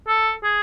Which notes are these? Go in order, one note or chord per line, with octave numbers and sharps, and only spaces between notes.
A4
G#4